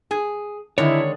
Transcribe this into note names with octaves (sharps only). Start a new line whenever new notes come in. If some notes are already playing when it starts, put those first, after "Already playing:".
G#4 G#5
D3 D#3 G#3 D4 E4 C#5